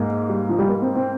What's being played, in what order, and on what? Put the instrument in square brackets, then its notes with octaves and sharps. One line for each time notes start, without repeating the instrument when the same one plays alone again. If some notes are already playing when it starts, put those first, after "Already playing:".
Already playing: [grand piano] G#2 A#3 [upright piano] G#3
[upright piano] G3
F3
G3
A#3
C4
C4